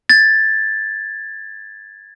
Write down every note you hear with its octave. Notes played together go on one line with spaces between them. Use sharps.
G#6 A6